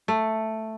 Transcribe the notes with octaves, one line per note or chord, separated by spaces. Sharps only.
A3